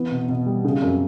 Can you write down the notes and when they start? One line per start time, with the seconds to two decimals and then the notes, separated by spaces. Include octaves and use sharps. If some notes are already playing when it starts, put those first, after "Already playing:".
Already playing: E3 B3
0.11 B2
0.29 B2
0.46 G3
0.65 C#3
0.82 F#2